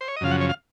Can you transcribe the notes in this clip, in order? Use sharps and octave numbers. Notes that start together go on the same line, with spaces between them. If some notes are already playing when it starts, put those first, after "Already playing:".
C5
C#5
D#5
F#2 C#3 F3 F5
F#5
C#5
F5